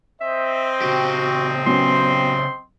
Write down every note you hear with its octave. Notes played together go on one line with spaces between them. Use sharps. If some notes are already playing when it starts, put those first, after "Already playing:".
C4 C5 D#5 E5
C#3 F#4 G4
F#3 B3 C#4 C6